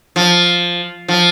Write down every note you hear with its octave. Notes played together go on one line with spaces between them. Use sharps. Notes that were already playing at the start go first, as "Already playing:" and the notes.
F3
F3